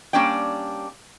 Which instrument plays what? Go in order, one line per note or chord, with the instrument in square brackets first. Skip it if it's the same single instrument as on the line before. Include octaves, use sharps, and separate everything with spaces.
[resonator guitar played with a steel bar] G3 A#3 C#4 D4 D5 G5